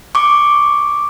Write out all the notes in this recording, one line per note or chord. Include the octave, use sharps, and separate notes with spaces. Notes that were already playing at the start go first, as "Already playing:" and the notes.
C#6 D6